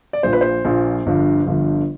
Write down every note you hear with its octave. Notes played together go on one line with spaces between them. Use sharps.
D5
A#1 A#2 F3 C5
B4
C5
A#1 A#2 F3
G1 G2 D3 F3
G1 G2 D3 F3